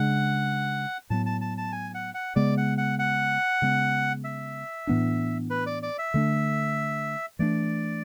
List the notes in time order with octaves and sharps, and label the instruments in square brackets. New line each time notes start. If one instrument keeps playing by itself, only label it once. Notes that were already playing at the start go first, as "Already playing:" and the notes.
Already playing: [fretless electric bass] C#3 G#3 D4 [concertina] F#5
[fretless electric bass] A2 F#3 B3 [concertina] A5
[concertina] A5
A5
A5
G#5
F#5
F#5
[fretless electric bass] C#3 G#3 B3 [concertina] D5
[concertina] F#5
F#5
F#5
[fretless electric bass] C#3 G#3 B3
[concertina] E5
[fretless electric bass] A2 E3 B3 D4
[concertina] B4
D5
D5
E5
[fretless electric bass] D3 A3 D4
[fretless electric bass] E3 A3 D4 [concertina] D5